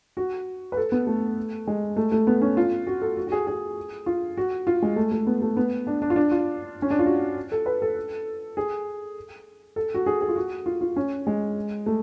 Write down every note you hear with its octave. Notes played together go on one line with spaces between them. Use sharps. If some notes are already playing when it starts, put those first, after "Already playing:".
F#4
B4
A4
B3
A3
G#3
A3
A3
B3
C#4
F4
F#4
A4
F#4
F#4
G#4
G#4
F4
F#4
F4
G#3
A3
A3
B3
A3
B3
D4
D4
F4
D4
F4
C#4
D4
F4
F#4
A4
B4
A4
G#4
A4
F#4
G#4
G#4
F4
F#4
F4
F4
C#4
G#3
A3